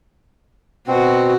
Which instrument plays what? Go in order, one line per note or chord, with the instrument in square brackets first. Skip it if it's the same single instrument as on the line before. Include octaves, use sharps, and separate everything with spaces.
[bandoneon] B2 C4 [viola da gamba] F#4